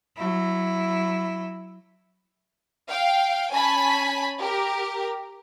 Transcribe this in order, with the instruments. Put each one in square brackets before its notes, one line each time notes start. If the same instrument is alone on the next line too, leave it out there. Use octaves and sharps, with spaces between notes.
[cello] F#3 E4
[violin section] F5 G5
C#4 G#5 A5 B5 B6
G4 A#4